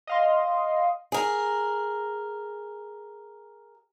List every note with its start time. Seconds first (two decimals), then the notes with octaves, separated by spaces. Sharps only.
0.07 D#5 F5 C6
1.12 G#4 A#4